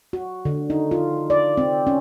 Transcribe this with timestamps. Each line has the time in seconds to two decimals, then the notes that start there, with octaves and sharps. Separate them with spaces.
0.13 F#4
0.45 D3
0.70 D#4
0.91 F4
1.30 D5
1.57 C4
1.87 C#4